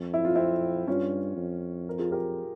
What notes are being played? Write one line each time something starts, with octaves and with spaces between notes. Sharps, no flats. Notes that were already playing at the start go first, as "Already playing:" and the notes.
Already playing: F2
E4
F4
C4 E4
G2 C#4 F4
F2
A#4
F4 G#4
G4 A#4